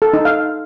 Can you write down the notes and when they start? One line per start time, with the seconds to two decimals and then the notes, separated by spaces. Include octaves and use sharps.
0.02 A4
0.14 D#4
0.25 F5